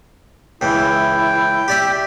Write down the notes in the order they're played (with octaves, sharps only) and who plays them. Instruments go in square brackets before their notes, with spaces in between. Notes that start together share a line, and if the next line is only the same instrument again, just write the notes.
[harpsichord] C#2 E3 [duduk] E4 [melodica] G5
[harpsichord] G4 D5 E5